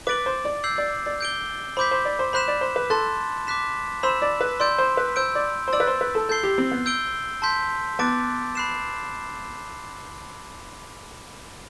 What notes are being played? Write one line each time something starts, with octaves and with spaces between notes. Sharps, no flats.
B4 D6 A6 D7 F#7
C5
D5
E6 G6 C7 F#7
D5
D5
G6 D7 G7
C5 B5 D6 G6 B6
C5
D5
C5
C5 B5 F#6 B6 E7
D5
C5
B4
A4 A5 C6 F#6 A6
D6 F#6 B6 E7
C5 B5 E6 B6 E7
D5
B4
D5 C6 E6 G6 D7
C5
B4
C5 E6 G6 D7
D5
C5
D5 E6 A6 D7 F#7
B4
C5
B4
A4
A4 G6 C7 G7
G4
C4
B3
E6 G6 D7 G7
A5 C6 G6 B6
B3 A5 D6 A6 D7
B5 F#6 C7 E7